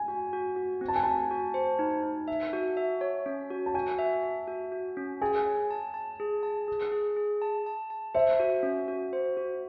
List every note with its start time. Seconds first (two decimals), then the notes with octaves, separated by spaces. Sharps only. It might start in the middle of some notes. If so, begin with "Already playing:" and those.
Already playing: G#5
0.08 F#4
0.33 F#4
0.56 F#4
0.81 C4
0.88 A5
0.96 G#5
1.03 F#4 A5
1.31 F#4
1.54 C5
1.79 D#4
2.03 D#4
2.28 E5
2.53 F#4
2.77 E5
3.01 C#5
3.26 C#4
3.50 F#4
3.66 A5
3.74 F#4 G#5
3.99 E5
4.24 E5
4.47 F#4
4.72 F#4
4.97 C#4
5.21 G#4 G#5
5.46 C#5
5.71 A5
5.94 A5
6.20 G#4
6.43 A5
6.68 G#4
6.92 G#4
7.17 G#4
7.42 A5
7.66 A5
7.90 A5
8.14 C5 E5
8.40 F#4
8.63 C#4
8.88 F#4
9.13 C5
9.37 F#4